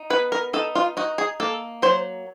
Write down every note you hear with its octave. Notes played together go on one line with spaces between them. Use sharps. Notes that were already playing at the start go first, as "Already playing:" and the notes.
Already playing: D#4
B3 B4
A#4
D#4 A4
F4
D#4 F#4
G#4
A#3 A4
F#3 C5